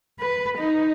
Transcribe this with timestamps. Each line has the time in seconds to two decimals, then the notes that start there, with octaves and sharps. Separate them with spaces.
0.19 B4
0.58 D#4